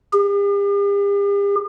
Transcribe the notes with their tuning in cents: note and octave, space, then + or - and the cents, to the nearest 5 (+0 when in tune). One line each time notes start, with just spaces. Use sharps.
G4 +45